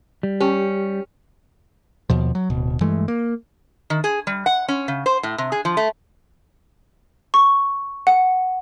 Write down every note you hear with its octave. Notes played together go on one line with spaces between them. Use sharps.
G3
C#4 G4
D#2 B2 F3
F#3
D1 B2
G2 E3 G#3 A3
A#3
D#3
G#4
G3
F#5
C#4
C#3
C5
A2
C3
G#4
F3
A3
C#6
F#5